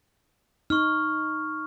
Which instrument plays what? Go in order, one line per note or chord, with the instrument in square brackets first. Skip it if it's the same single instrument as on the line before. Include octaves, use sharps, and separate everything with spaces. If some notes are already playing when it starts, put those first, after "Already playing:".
[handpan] D#4 [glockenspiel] C#6 F6